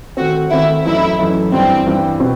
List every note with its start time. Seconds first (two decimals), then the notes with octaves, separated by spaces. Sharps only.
0.17 D#3 A3 C4 F#4
0.51 D#3 A3 C4 E4
0.85 F#2 E3 A3 D#4 E4
1.19 F#2 E3 A3 D#4
1.52 G2 E3 G3 C4
1.87 G2 E3 G3
2.20 B2 C4